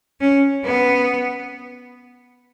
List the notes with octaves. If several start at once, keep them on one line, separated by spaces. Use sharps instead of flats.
C#4
B3